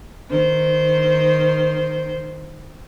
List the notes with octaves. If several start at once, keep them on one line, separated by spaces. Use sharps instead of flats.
D#3 C5